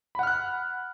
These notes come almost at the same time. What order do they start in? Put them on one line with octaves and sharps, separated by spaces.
B5 F#5 F6 F#6